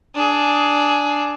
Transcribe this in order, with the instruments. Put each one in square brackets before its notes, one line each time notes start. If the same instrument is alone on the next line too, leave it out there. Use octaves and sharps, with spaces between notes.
[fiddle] D4 G#4